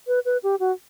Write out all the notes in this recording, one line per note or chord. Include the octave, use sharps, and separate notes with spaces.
B4
B4
G4
F#4